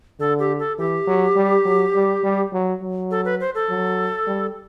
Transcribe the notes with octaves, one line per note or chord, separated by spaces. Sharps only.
D3 A4
G4
A4
E3 G4
F#3
G3
F#3
G3
G3
F#3
F#3
A4
B4
C5
A4
F#3
G3